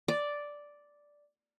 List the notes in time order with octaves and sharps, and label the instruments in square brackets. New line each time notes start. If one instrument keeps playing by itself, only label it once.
[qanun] D5